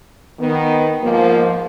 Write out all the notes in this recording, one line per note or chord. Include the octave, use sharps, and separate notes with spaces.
D#3 B3
G#2 F3 A#3